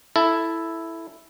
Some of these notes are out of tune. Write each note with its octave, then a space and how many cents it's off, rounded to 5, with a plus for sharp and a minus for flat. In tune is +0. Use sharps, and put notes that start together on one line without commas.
E4 +0 A4 +0